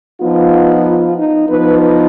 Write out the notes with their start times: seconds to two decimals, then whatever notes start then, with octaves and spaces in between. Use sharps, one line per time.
0.20 F3 B3 D#4 F4
0.84 F4
1.17 D#4
1.48 F3 B3 D#4 B4